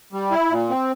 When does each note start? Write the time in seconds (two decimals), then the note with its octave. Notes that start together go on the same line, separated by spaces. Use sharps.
0.13 G3
0.31 E4
0.50 A#2
0.70 C4